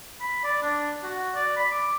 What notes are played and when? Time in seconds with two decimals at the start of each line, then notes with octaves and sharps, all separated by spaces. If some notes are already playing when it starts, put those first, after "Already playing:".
0.21 B5
0.44 D5
0.63 D4
1.03 F#4
1.35 D5
1.56 B5
1.71 D6